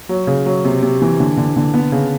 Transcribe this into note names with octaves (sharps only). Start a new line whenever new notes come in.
F#3
C#3
F#3
C3
C3
E3
D3
D3
D3
B3
C#3